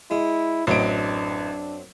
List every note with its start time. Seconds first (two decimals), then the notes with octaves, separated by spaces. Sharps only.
0.11 G#3 E4
0.67 A1 F#2 F#3 C4 D4 D#5 D7